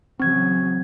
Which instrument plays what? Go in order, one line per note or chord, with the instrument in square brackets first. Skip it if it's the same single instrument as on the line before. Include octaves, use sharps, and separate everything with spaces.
[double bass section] C#3 E3 F#3 [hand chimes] C4 G#6